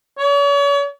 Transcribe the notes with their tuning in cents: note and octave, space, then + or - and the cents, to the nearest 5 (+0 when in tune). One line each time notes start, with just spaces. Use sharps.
C#5 +40